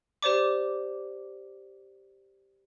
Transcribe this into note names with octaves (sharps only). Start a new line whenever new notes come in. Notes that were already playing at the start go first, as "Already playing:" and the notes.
G4 C5 D5 D6